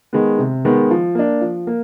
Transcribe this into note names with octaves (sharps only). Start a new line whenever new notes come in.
D#3 G#3 B3
C3
D#3 G#3 B3
F3
A#3 D4
F3
A#3